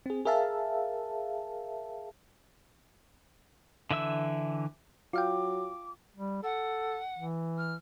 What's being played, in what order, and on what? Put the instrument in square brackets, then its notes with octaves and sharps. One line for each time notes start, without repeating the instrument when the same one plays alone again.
[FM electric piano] C4 G#4
G#4 A#4 E5 F5 A5
[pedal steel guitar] D3 E3 E5 E6
[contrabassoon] F#3 [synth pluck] F4 F5 G5 [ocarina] D6
[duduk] G3
[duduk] A4 [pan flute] F#5
[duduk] E3
[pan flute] F6